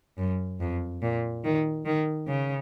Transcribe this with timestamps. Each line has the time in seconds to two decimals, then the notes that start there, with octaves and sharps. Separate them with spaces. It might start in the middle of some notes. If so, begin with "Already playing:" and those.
0.18 F#2
0.60 F2
1.02 A#2
1.44 D#3
1.85 D#3
2.27 C#3